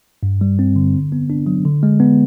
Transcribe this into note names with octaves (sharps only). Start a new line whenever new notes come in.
G2
G3
C4
D3
D3
B3
D4
F#3
D3
G#3
B3